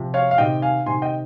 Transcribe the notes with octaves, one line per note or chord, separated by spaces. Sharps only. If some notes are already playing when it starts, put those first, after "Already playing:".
Already playing: C3 F3
C#5 F5
F5
C3 D#3 D#5 G5
F5 G#5
C3 D#3 G#5 C6
D#5 G5